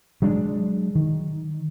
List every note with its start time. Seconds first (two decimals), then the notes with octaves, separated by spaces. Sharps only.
0.22 F#3 G#3 D4
0.95 D#3